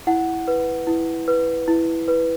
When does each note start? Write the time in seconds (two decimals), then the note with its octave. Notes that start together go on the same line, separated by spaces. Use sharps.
0.07 E4 F#5
0.48 B4
0.87 E4
1.28 B4
1.68 E4
2.08 B4